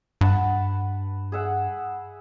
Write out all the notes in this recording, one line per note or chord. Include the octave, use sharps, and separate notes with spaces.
G2 B4 F#5 A5
G#4 E5 F#5